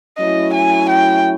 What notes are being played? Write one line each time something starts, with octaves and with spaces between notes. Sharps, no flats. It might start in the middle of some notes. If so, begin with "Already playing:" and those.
F#3 A3 C#4 E4 D#5
G#5
G5